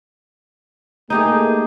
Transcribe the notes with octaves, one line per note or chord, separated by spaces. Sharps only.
A3 A#3 D#4 G4 G#4